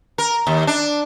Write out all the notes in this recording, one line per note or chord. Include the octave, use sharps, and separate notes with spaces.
A#4
D#2
D4